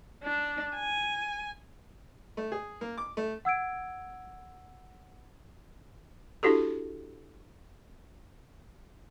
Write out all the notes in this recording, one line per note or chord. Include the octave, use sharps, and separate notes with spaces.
D4
G#5
A3
G#4
A#3
D6
A3
F#5 E6 G#6 D7
D4 E4 F#4 G4 A4